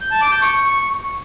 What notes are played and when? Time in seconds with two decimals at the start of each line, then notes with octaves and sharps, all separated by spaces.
0.01 G6
0.11 A5
0.21 D6
0.32 G6
0.42 C#6